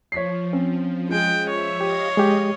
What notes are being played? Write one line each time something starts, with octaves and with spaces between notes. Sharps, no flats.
F3 C#5 B6 C7
C4 C#4
G#3 F4 G#4 G5
F3 C#5 E5
G4 D#5 F5 D#6
G#3 G4